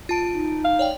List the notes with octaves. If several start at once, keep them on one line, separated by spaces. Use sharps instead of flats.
F4 A5 D7
D#4
F5
C#5 D5 G5